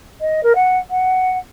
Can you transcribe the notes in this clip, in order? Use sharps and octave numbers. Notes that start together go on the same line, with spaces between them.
D#5
A#4
F#5
F#5